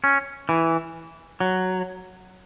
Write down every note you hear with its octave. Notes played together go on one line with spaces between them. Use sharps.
C#4
E3
F#3